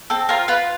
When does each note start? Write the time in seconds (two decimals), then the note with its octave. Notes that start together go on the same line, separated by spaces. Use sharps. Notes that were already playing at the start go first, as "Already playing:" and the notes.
0.10 C4 A4
0.29 F4 A#4
0.48 F4 B4